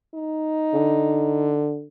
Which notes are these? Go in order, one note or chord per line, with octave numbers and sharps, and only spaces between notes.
D#4
D3